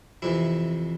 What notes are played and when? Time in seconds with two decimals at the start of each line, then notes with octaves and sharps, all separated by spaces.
0.22 F2 C3 E3 E4